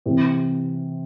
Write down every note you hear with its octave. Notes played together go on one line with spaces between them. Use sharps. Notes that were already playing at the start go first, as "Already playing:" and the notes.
C3 E3 C4